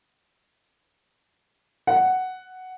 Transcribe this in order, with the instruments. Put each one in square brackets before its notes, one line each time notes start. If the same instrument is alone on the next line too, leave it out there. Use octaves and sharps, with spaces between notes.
[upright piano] F#5